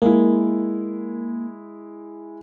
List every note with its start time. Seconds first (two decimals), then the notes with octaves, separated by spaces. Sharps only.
0.02 G#3 A#3 E4